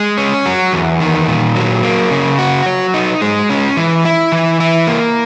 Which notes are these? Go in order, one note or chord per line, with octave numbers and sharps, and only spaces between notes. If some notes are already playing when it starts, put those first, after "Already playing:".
Already playing: G#3
C#4
F#3
E2
D#3
A#2
F#3
A#3
C#3
F#4
F#3
D#4
G#3
C#4
E3
E4
E3
E4
A#3